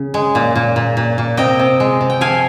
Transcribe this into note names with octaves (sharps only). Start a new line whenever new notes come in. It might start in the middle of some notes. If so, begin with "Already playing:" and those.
Already playing: C#3
G#3
A#2
A#2
A#2
A#2
A#2
C3 D#5 G5
C3
G#3
C3
G5
F3 F5 G#5